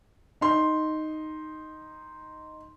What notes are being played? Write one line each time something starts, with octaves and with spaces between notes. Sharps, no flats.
D#4 C6